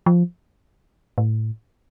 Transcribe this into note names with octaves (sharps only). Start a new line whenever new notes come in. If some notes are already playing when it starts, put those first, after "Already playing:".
F3
A2